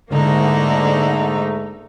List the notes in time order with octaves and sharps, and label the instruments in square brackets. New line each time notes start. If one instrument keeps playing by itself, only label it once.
[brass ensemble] G#2 A3 [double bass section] D3 [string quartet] A#3 D#4 E4